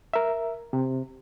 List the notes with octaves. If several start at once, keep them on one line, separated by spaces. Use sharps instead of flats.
A#4 E5
C3